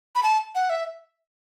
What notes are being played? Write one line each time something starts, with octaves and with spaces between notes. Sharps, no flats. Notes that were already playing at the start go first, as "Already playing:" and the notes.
B5
A5
F#5
E5